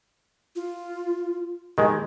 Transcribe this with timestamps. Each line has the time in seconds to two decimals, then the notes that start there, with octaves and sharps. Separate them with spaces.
0.56 F4
1.78 D#3 G#3 G4